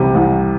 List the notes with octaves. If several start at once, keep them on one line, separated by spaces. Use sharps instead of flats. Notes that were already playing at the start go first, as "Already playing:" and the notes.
Already playing: C2 C3 G3
C2